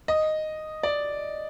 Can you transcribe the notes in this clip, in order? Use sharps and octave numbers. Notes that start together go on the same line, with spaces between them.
D#5
D5